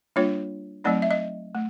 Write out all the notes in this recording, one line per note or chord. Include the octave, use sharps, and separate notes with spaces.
G3 A#3 D4 F4 C#5
F#3 A3 C4 D#4 D5
E5
D#5
A3